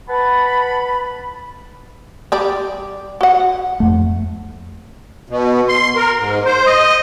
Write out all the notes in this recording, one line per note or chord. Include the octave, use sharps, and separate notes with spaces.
B4 F#5 A5 B5
G3 G4 D5
F#4 F#5
F2 A3
B2
C6
A#4
G#2
C5
D#5